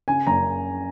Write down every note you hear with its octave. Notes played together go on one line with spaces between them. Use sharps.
C#3 G#5
F#1 A#5